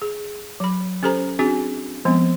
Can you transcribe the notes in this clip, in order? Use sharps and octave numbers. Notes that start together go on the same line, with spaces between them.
G#4
F#3 B5
C#4 G4 A4 C5 A#5
C4 D4 F#4 G#4 G#5
F3 G#3 B3 C4